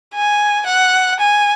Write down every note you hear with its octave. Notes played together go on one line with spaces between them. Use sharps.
G#5
F#5
G#5